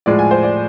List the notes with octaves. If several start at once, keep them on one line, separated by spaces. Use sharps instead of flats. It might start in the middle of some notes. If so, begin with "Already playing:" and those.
A2 F3 G#3 D5
G#5
C5
D5